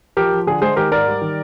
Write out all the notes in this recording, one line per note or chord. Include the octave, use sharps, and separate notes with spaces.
F3 G4 A#4
F3
D3 G#4
G#3 G#4 C5
D#3 G4 A#4
G#2 A#4 D5
G3
D#3